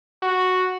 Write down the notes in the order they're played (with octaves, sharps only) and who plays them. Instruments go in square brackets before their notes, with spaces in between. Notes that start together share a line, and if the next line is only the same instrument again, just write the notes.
[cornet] F#4